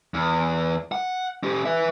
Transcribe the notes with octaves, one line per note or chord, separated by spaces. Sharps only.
E2
F#5
C#4 G4
B4 E5